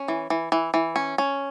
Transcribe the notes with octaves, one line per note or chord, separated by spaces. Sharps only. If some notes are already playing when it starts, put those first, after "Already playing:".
Already playing: C#4
E3
E3
E3
E3
C#4
C#4